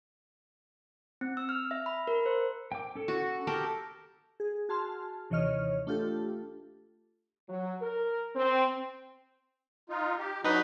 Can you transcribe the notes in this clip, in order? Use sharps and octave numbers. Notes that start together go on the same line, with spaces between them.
C4
E6
F6
E5
B5
A#4
C5
G5 D6
C#4 A4
F#4
G4 A4 A#4
G#4
F#4 G#4 A5 C6 F6
D#2 C3 E3 C#5 D#5 F6
A3 D4 F4 G4 A4
F#3
A#4
C4
D#4 F4
G4
F#3 D4 D#4 F#4 B4